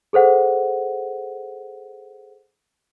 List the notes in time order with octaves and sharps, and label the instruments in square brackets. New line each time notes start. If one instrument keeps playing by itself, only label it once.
[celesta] G#4 A4 C5 F#5